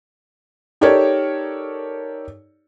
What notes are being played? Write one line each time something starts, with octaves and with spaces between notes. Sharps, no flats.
D#4 G4 A4 A#4 C#5 D5